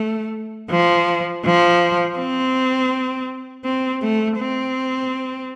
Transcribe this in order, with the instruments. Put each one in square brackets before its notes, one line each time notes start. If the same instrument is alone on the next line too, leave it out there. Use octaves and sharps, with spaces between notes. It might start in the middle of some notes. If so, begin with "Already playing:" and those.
Already playing: [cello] A3
F3
F3
C4
C4
A3
C4